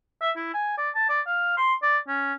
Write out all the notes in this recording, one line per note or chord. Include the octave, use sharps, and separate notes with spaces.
E5
E4
G#5
D5
A5
D5
F5
C6
D5
C#4